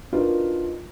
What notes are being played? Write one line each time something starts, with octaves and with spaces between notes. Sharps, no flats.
D4 D#4 F4 F#4 A#4 B4